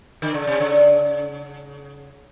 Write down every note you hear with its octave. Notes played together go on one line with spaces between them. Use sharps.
D3
C#3
C3
C#3